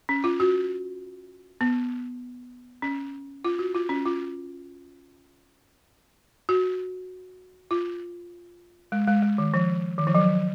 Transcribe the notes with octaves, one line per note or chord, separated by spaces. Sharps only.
C#4
F4
F#4
B3
C#4
F4
F#4
F4
C#4
F4
F#4
F4
G#3
G#3
G#3
D#3
F3
D#3
F3
F#3